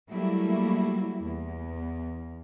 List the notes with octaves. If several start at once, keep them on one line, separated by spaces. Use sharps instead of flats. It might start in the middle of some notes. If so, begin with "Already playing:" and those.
F#3 G3 A3 A#3 E4
E2